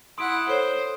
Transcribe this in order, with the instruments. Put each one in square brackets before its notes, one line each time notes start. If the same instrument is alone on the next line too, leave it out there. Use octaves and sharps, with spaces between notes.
[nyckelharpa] E4 F#5 [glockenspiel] C6 D#6 D7
[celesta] A4 C#5 [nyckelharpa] C5